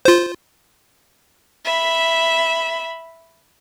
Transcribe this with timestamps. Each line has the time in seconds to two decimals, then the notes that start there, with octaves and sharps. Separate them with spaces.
0.05 F4 C5
1.65 E5 B5